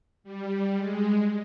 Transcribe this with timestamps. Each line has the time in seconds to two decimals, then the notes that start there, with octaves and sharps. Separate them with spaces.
0.24 G3
0.77 G#3